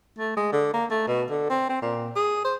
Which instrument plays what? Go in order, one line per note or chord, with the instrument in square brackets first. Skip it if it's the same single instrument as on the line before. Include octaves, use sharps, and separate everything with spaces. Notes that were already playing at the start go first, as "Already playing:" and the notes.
[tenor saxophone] A3
G#3
D3
A#3
A3
B2
D3
C4
C4
A#2
G#4
C5